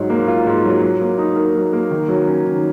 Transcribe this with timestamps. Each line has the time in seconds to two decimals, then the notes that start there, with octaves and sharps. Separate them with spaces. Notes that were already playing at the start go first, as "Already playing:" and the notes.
Already playing: G#2 F#3
0.10 A#3
0.28 F4
0.46 G#2
0.64 F#3
0.82 F#3
1.01 A#3
1.18 D#4
1.36 A#4
1.55 F#3
1.73 A#3
1.91 D#3
2.08 F#3
2.27 C#4
2.45 D#3